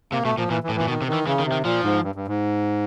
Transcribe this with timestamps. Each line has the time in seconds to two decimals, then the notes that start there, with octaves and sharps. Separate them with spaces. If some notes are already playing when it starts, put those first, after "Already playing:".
0.12 C3 A#3
0.24 B2 A3
0.37 A#2 F3
0.50 A#2 E3
0.63 E3
0.69 A2
0.76 E3
0.81 A#2
0.88 B2 D#3
1.02 C3
1.08 D#3
1.13 E3
1.26 C#3 E3
1.39 D#3
1.45 C3
1.52 D#3
1.64 A#2 F3
1.84 G#2
2.03 G2
2.15 G2
2.28 G#2